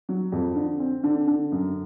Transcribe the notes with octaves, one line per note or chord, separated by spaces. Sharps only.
F#3
F2
D3
C4
D3
D3
F#2